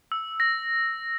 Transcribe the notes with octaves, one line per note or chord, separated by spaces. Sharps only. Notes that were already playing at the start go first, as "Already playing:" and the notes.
E6
A#6